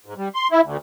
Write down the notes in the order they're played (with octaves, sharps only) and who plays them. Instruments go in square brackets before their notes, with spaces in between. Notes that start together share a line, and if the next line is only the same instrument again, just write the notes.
[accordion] G#2
G3
C6
E4
D2